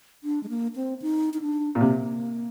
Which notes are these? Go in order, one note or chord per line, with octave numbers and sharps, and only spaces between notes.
D4
G#3
A#3
C4
D#4
D#4
D4
A#2
C3 A#3